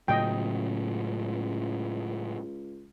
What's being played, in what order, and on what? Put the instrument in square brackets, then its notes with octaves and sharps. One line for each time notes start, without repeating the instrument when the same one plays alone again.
[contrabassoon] C#2 [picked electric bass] A2 C#3 F#3 [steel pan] D#5 G5